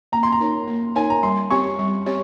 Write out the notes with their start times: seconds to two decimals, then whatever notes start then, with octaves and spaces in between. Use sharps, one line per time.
0.12 A#3 A#5
0.23 C6
0.32 A#5
0.40 D#4 A#4 C#5
0.67 A#3
0.95 D#4 A#4 C#5 G#5
1.10 A#5
1.23 G3 C6
1.50 C4 G4 C#5 C#6
1.79 G3
2.06 C4 G4 C#5